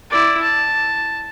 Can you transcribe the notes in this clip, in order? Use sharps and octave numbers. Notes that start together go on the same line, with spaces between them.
E4 D5
A5